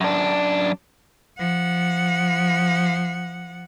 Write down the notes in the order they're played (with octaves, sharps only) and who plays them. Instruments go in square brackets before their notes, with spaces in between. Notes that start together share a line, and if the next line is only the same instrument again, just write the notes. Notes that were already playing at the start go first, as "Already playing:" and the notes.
[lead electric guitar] F#2 D4
[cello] F3 F#5